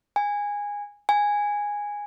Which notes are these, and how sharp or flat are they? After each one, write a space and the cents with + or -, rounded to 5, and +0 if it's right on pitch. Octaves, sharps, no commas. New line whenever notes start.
G#5 -15
G#5 -10